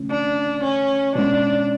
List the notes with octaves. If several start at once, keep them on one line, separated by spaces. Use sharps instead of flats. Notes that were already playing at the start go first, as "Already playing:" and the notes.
Already playing: C#3 A3 C#4
D4
C#4
B2 G#3 C#4 D4